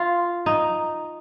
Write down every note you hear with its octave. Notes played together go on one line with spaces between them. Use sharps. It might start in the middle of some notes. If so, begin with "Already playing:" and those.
Already playing: F4
D#4